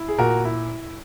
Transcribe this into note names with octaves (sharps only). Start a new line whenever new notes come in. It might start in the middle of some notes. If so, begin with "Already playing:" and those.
Already playing: E4
G#4
A#2 F#4 A#4
E4